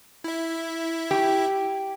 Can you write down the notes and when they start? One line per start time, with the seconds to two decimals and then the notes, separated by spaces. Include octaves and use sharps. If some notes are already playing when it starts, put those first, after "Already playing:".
0.24 E4 E5
1.11 G4